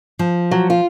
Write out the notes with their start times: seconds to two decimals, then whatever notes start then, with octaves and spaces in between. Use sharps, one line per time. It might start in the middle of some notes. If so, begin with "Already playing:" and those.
0.19 F3
0.51 F#3
0.70 F4